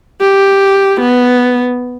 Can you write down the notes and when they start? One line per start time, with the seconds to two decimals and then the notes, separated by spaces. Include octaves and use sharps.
0.21 G4
1.01 B3